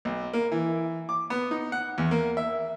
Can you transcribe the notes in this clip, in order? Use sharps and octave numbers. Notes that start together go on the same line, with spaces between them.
B1
A#3
E3
D6
B3
D#4
F#5
E2
A#3
E5